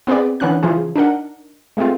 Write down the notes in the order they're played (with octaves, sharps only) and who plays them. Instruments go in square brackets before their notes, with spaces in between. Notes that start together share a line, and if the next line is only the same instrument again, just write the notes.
[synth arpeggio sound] B3 C4 G#4 B4 D5
D#3 E3 B3 C#4 D4 F#6
C#3 E3 F3 F4 G#4
D4 D#4 A#4 F#5
G#3 A3 B3 C4 F4